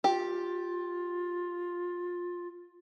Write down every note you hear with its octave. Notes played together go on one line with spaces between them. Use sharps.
F4 G4